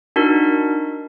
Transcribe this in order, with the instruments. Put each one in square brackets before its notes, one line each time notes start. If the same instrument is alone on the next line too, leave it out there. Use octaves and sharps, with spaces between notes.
[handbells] D4 D#4 F#4 A#4